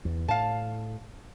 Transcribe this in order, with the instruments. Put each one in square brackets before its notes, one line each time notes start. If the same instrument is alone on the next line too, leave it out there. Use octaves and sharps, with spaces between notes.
[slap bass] E2
[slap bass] A2 [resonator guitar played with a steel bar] F5 A5